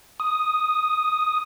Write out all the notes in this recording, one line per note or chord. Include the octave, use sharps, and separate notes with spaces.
D#6